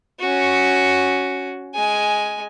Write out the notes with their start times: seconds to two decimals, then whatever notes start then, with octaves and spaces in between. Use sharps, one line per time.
0.20 C#4 F#4
1.75 G#3 G#5